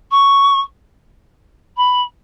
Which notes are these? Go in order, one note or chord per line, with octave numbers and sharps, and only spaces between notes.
C#6
B5